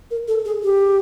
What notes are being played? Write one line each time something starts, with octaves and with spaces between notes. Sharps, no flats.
A#4
A4
G#4
G4